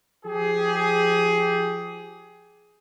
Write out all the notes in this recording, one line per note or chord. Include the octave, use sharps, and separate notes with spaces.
F3 G4 G#4